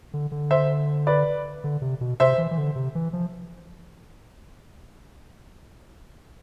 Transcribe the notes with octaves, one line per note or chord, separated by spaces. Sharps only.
D3
D3
C5 E5
B4 D5
D3
C3
B2
C3 C5 E5
E3
E3
D3
C3
E3
F3